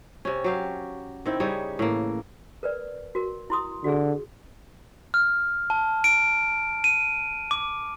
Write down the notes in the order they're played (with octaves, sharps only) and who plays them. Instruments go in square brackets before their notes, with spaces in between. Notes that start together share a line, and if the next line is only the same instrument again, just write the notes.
[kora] C3 C#4
F#3 G4 F5
D#3 C4 E4
C#3 G3 D#4 C#5
A2 E3 A#3
[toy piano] A#4 B4 D5
F#4 A#4
E4 C6 D#6
[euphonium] D3 [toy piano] F#4 G#4
[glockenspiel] F6
A5
D7
D#7
D6